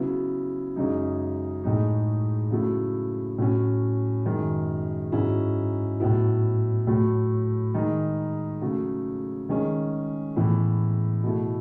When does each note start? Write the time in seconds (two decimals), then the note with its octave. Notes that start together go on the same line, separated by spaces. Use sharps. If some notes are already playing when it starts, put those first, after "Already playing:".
Already playing: C#3 F#3 B3 E4
0.76 F#2 C#3 G#3 D#4
1.64 A2 G#3 D#4
2.51 C#3 F#3 A3 E4
3.38 A2 F#3 C#4
4.25 F#2 D#3 G#3
5.12 G#2 F#3 C#4 E4
6.00 A2 F#3 B3 E4
6.87 A2 F#3 A3
7.74 D#3 G#3 D#4
8.61 C#3 F#3 A3
9.49 D#3 G#3 C#4
10.36 A2 E3 B3 E4
11.23 B2 A3 E4